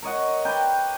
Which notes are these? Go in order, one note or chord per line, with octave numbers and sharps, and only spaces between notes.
A#4 C#5 D#5 F#5
B4 D5 G5 A#5